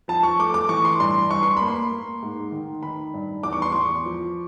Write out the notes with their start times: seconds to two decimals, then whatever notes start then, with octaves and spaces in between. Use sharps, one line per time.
0.08 F3 A5
0.23 C#6
0.38 A3 D6
0.54 D6
0.69 E3 C#6
0.85 C6
1.00 G2 C6
1.30 G2 C#6
1.43 C6
1.57 A#3 B5
1.68 C6
1.92 A#3
2.22 G#2
2.52 D#3
2.83 D#3 B5
3.14 G2
3.43 E2 D6
3.53 C#6
3.62 C6
3.72 E2 C#6
4.05 F3